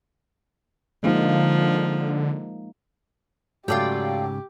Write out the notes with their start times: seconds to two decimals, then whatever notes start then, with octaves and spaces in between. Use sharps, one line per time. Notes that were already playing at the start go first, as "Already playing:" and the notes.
1.03 D3 F3 G#3 A#3 D#4
3.68 G#2 C#3 F#3 A3 F4 G4 D5 G5